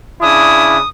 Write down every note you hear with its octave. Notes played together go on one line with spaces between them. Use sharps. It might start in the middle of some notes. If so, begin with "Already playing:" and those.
C#3 D4 E4 D#6